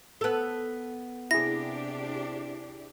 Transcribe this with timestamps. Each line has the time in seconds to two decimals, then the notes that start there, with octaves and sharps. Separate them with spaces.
0.21 B3 A4
1.31 C3 D4 E4 G4 G#4 A#6